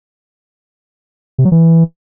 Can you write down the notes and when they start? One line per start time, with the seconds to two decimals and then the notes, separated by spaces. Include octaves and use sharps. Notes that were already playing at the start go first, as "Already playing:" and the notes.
1.38 C3
1.45 F#3
1.52 E3